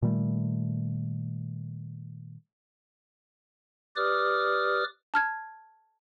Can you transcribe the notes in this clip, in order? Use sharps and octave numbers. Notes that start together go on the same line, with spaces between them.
A#2 D#3 G3 A3
G4 B4 D5 D6 D#6 F6
A5 F6 G#6